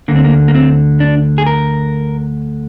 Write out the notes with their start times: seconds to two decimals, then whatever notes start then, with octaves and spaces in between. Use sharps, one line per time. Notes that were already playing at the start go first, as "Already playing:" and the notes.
0.08 D2 D3 A#3
0.16 C4
0.24 A#3
0.48 A#3
0.55 C4
1.00 D4
1.38 G#4
1.46 A#4